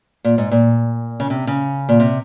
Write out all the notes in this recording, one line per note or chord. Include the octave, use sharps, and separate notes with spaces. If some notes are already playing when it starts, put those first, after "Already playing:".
A#2
G#2
A#2
C#3
C3
C#3
A#2
C3